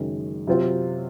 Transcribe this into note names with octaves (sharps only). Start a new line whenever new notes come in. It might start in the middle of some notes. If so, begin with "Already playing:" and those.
Already playing: F#1 F#2 D#3 G#3
C3 F#3 C4 F4